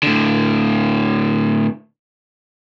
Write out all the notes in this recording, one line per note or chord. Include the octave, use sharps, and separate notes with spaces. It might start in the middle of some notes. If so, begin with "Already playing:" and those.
A2 D3